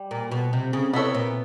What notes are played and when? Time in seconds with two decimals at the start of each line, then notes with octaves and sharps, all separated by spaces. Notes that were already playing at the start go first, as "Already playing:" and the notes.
Already playing: G3
0.11 A#2
0.31 B2
0.53 C3
0.73 C#3
0.93 C3 B3 E4 A4 C#5
1.14 A#2